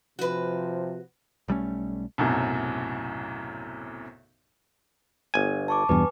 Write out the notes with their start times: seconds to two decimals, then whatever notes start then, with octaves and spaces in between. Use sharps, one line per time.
0.19 C3 F3 F#4 B4
1.48 B1 G3 A3 C#4
2.18 B1 F#2 A2 C3
5.34 G1 G#5
5.68 A5 C#6 D6
5.89 E2 G2 B2 B4 G#5